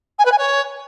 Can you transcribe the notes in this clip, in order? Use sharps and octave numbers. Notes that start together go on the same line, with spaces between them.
G#5
B4
G#5
C#5